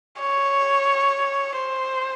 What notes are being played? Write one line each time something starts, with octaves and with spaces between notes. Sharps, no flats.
C#5
C5